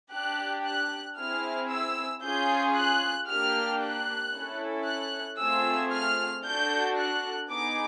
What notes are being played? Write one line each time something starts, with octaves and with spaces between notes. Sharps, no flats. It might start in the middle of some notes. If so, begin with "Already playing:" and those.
D4 G4 F#6
F#6
C4 E4 G#4 F6
E6
C#4 F4 G#4 G6
F#6
A#3 D4 G4 F6
F#6
C#4 E4 A4
F#6
A3 C4 F4 G#4 E6
F6
D4 F#4 A4 G6
F#6
B3 D#4 G#4 D6